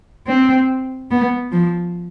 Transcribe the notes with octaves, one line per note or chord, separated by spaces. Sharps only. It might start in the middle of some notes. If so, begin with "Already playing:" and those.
C4
B3
F3